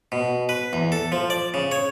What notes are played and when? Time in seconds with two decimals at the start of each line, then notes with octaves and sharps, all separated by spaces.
0.12 B2
0.49 B4
0.73 E2
0.92 A4
1.12 F3
1.30 D5
1.54 C#3
1.72 C#5